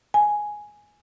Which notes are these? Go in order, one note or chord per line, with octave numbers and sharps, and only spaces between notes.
G#5